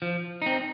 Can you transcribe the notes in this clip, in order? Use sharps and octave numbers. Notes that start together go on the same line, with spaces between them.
F3
C4 D#4